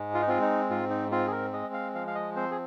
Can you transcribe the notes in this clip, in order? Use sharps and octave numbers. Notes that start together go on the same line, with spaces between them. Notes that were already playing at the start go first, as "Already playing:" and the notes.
Already playing: G#2 G#3
F4
D#4
C4 F4
D#4
G#2 F4
D#4
C4 F4
G#4
A#4
G#3 D#5
F5
F3 F5
F5
D#5
C4 C5
G#4